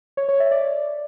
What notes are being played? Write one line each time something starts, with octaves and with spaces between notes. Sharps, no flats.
C#5
C#5
E5
D5